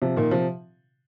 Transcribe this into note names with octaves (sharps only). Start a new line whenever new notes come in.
C3 F3
A#2 D#3
C3 F3